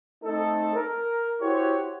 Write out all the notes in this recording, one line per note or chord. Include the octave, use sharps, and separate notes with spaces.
A3 C4 D#4 A4
A#4
E4 F#4 G4 C5 C#5